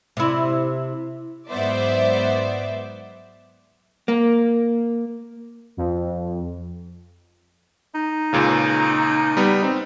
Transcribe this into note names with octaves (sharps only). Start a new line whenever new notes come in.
C3 E4
G#2 F#3 B3 C5 D5 E5
A#3
F2
D#4
C#2 A#2 C#3
G3 B3
C4 D#4